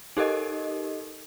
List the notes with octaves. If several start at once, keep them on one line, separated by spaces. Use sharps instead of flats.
D#4 G4 A4 A#4 D#5